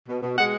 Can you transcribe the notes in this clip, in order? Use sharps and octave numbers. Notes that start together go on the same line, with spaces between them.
B2
B2
G#3 F#5